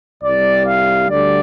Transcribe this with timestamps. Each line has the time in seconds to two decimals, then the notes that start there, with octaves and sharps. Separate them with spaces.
0.23 C2 C3 G3 D5
0.66 F5
1.09 D2 D3 G3 D5